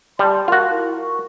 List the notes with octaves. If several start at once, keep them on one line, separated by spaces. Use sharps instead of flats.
G3 D5 A5 C6
F4 F#4 A#4 F5
E4 A#4
C#6